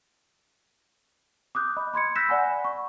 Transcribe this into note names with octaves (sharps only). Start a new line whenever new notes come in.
D6 D#6 F#6 G6
D#5 B5
B5 C6 G#6 C#7
E6 F#6 G6 A#6 B6 E7
D5 F#5 G#5 B5
C#6